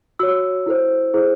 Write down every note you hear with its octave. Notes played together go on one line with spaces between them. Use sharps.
F#4 C#5 E6
E4 A4 C5
E4 G#4 C5